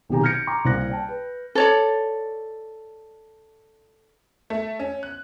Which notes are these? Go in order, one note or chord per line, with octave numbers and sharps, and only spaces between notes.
B1 C3 D#3 G4 G#5 A#5
F6 G6 G#6 A#6 C#7 D7
A#5 C6 D6
C2 A#3 E4 C5 F#6 A#6
D5 G5 A5
B4
A4 C#5 D5
A3
C#4
F#6